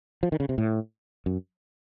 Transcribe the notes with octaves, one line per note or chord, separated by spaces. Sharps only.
F3
D#3
C#3
C3
A2
F#2